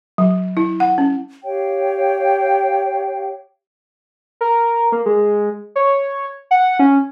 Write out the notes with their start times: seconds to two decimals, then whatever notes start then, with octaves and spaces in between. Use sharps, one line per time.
0.18 F#3
0.57 E4
0.80 F#5
0.98 C#4
1.44 G4 C#5 F5 G5
4.41 A#4
4.92 A#3
5.06 G#3
5.76 C#5
6.51 F#5
6.79 C#4